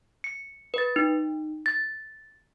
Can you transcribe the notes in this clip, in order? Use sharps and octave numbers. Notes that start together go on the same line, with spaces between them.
C#7
B4 A6
D#4
A6